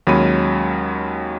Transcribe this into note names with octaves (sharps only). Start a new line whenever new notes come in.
D#2 F#3 G#3 C#4 B5 D#7